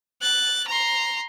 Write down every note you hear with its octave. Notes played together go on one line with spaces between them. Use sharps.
F#6 A6
A#5 C6